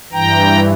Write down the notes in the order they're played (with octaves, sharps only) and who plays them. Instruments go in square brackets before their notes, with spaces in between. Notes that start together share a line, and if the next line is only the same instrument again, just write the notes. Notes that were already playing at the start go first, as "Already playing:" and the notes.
[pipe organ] G2 E3 G5 A#5